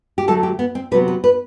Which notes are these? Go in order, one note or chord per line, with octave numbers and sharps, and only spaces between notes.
G4
D3 F#3 A3 A4
G4
B3
C4
C3 F#3 B3 B4
B4
B4